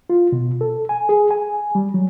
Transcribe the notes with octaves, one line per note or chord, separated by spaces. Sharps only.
F4
B2
A4
G#5
G#4
G#5
G3
F#3